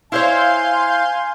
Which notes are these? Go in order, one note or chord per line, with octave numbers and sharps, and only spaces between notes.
E4 C5 C#5 F5 G#5 C6 G6